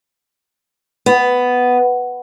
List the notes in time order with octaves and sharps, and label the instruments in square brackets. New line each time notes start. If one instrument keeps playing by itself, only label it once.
[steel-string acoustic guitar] B3